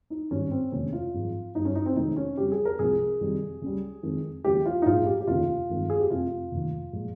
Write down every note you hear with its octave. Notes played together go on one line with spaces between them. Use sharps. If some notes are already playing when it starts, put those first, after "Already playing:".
D#4
G#1 G2 D#3 G3 C#4
C4
F1 D#2 C#3 G#3 C#4
F4
G#1 G#2 F3
G1 G2 G3 D#4
C#4
D#4
C4
F1 F2 D#3 G#3 D#4
C#4
F2 C#3 G3 G4
G#4
A#4
C2 C3 F3 G#3 G#4
F2 C3 D#3 G3
C#2 C#3 G3
F2 D#3 G#3
D#2 C#3 F3 G#3 G4
F4
D#4
A#1 G#2 F3 F4
G4
G4
F1 D#2 C#3 F4
G1 F2 D#3 G#3
G#4
G4
F1 F2 C3 F4
F1 D#2 D#3
A#2 F3 G#3